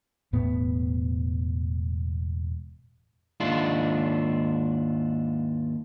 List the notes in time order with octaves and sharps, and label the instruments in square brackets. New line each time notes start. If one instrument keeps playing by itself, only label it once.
[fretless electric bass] E1 A2 B3
[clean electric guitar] D#2 G#2 D4 E4 F4